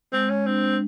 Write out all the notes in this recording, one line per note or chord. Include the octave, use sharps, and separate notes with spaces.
G#3 C4
G#3 C#4
C4 D4
G#3